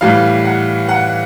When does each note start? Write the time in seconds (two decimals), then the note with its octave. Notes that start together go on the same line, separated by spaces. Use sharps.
0.01 A2 E3 G3 F5
0.45 F#5
0.89 F#5